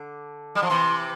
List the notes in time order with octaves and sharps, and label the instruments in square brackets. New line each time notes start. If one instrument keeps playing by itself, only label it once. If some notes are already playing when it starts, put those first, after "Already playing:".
Already playing: [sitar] D3
G3
F3
[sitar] C3 E3 [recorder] C6